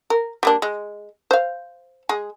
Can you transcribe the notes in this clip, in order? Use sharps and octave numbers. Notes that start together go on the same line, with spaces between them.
A#4
G3 A#3 D4
G#3
C5 F5
G#3 G#4